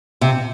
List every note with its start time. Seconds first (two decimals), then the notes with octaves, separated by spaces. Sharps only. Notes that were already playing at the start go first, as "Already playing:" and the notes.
0.21 C3